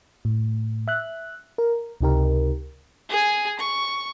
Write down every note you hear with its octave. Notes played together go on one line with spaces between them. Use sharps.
A2
E5 F#6
A#4
C#2 C3 D#4 G4 A#4
G#4 G#5
C#6